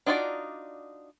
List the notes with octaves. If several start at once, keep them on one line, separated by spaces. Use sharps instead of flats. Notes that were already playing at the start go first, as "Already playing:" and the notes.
D4 D#4 F4 F#4 D5